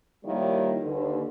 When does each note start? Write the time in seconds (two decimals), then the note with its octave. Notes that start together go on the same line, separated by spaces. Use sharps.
0.24 D#3 F3 G3 A#3 E4 C#5
0.83 D#2 D3 B4